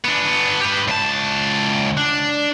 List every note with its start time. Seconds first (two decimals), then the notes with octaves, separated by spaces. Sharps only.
0.05 B3 D4
0.61 G4 B4
0.88 C#2 A5
1.97 D4